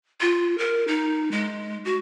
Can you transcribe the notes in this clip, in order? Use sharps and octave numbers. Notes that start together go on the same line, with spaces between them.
F4
A#4
D#4
G#3
F#4